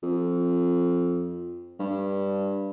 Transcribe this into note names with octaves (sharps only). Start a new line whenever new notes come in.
F2
G2